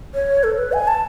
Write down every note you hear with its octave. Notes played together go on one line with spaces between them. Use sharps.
C#5
A4
B4
G#5
A5